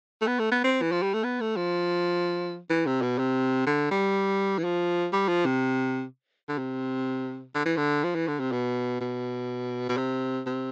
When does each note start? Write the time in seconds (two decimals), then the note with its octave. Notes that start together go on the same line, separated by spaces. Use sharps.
0.22 A3
0.27 B3
0.39 A3
0.52 B3
0.64 C4
0.82 E3
0.92 F3
1.02 G3
1.14 A3
1.24 B3
1.41 A3
1.57 F3
2.70 E3
2.86 C3
3.02 B2
3.19 C3
3.67 D3
3.91 G3
4.59 E3
4.64 F3
5.13 G3
5.29 F3
5.45 C3
6.49 D3
6.58 C3
7.55 D3
7.66 E3
7.77 D3
8.04 F3
8.15 E3
8.28 D3
8.40 C3
8.52 B2
9.01 B2
9.89 B2
9.97 C3
10.46 C3